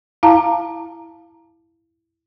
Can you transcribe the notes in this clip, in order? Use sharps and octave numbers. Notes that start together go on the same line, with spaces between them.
E4 F5 A5 A#5